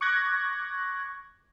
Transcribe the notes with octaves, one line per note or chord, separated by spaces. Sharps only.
C#6 D6 F#6 G#6 A#6